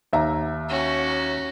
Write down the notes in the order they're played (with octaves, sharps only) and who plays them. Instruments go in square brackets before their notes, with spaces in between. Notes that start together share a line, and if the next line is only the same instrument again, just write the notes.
[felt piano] D#2 E5 A#5
[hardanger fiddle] C#4 F#4